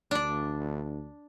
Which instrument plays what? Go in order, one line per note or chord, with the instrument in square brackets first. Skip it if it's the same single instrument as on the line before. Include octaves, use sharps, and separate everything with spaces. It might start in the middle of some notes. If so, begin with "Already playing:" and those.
[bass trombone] D2 [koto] D4 D5